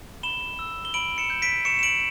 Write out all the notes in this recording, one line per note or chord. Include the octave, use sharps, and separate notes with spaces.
B5 E7 G7
E6
G7
B5 D7 F#7
C#7 E7
G6
B6 D7
C#6 C#7 E7
E7
D7 F#7